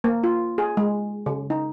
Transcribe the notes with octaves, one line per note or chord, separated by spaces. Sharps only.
A#3
F4
G#4
G#3
C#3
D#4